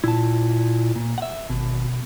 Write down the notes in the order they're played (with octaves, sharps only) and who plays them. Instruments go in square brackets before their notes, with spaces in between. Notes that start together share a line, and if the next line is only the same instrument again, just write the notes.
[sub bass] A#2 [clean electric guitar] E4 A5
[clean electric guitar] A#2
E5 F#5
[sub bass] G#1 [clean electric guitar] B2